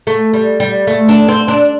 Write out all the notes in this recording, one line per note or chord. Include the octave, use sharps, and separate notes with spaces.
A3
G3
G3
A3
D4
C4
D4